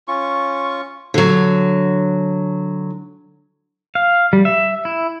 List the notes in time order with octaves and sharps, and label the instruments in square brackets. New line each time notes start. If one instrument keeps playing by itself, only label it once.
[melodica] C#4 F4 C#6
[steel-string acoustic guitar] D3 F#3
[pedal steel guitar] F5
G3
E5
E4